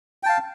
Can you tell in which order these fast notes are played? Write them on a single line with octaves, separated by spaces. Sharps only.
G5 A5 F5